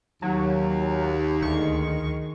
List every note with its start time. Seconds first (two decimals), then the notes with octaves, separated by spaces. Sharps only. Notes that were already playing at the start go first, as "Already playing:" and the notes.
0.22 D#2 F#3
1.42 D2 D#3 G#3 C#6